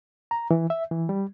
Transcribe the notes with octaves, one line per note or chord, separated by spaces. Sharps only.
A#5
E3
E5
E3
G3